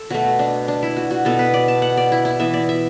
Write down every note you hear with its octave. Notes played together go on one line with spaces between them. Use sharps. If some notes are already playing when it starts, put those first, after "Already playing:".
Already playing: A4
B2 A3 F#4
D4
D4
E4
F#4
F#4
B2 B3 A4
B4
D5
A5
F#5
D5
E4
E4
E3 B3 E5
D5
E5